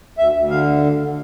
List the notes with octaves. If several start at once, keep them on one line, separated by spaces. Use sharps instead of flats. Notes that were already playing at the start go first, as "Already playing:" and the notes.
D2 E5
D2
D3 F5